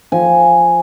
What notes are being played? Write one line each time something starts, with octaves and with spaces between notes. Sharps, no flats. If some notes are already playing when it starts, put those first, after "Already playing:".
F3 G#5